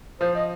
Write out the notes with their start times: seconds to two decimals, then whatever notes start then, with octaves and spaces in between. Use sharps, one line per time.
0.21 F3 C5
0.35 D#5